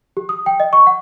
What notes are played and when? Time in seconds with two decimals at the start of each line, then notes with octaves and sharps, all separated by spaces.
0.17 G4
0.29 D#6
0.46 G5
0.60 D#5
0.73 C#6
0.87 F#5